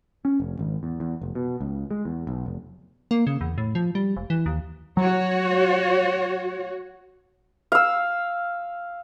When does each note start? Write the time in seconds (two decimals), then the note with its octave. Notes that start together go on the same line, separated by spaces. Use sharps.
0.25 C#4
0.40 F1
0.59 G#1
0.83 E2
1.00 E2
1.22 F1
1.35 B2
1.61 C#2
1.91 G#3
2.05 E2
2.27 B1
2.46 F1
3.11 A#3
3.27 C#3
3.41 E2
3.58 A2
3.75 F3
3.95 G3
4.17 F1
4.30 E3
4.46 D#2
4.97 F#3 F#4 C#5
7.72 F5 E6